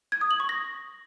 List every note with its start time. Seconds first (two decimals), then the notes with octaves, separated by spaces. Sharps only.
0.12 G#6
0.21 D#6
0.31 F#7
0.40 C#6
0.49 A#6